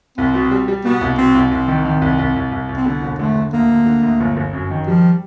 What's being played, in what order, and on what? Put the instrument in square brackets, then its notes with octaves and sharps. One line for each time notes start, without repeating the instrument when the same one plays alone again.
[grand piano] C2 [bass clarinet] C4
[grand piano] B2
G3
G3
[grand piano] B2 [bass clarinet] B3
[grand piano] C2
[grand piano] B2 [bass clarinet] C4
[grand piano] C2
[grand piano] C2 [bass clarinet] C4
[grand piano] D#3
D#3
C2
C2
C2
C2
C2
[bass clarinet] C4
[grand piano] D3 [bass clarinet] B3
[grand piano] E1
[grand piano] D3 [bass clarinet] A3
[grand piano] D3
[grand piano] D2 [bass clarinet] A#3
[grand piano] D2
D3
D2
G1
G1
F#2
D#3
[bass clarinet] F3 [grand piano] G3